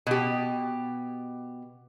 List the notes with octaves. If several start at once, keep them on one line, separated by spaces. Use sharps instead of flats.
B2 G4